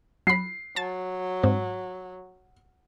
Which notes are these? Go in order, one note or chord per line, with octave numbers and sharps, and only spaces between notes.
F#3 B5 C7
F#3 A5 A6
G#2 C4